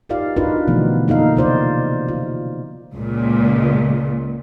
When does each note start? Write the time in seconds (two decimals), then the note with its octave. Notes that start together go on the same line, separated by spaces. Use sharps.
0.09 D#4 F4 G4 A#4 D5 F5
0.36 D4 D#4 F4 F#4 A#4 B4
0.67 B2 D3 E3 F3 A3 B3
1.08 A#3 D#4 A4 F5
1.36 C3 F4 C5 D5
2.08 F4
2.94 C#2 A#2